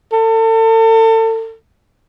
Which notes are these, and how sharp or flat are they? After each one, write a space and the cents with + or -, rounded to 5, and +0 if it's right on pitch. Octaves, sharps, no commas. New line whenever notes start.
A4 +35